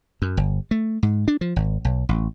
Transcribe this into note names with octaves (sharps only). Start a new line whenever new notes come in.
F#2
G1
A3
G#2
D4
F3
G#1
B1
A1